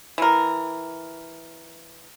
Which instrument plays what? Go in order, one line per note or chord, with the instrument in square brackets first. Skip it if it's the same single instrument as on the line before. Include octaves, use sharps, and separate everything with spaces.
[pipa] E3 A#4